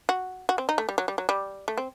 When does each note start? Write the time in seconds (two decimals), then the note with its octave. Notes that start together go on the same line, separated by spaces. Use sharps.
0.09 F#4
0.49 F#4
0.58 C4
0.69 D#4
0.78 A3
0.89 G3
0.98 F#3
1.08 G3
1.18 F#3
1.29 G3
1.68 A3
1.78 C4